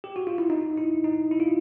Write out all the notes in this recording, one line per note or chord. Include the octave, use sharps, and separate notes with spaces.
G4
F#4
F4
E4
D#4
E4
D#4
E4
F4